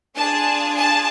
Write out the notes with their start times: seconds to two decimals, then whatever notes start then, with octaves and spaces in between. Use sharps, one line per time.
0.16 D4 F4 G#4 A5
0.75 A5